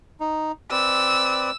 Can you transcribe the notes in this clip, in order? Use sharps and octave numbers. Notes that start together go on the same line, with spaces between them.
D#4
C4 B4 D5 E6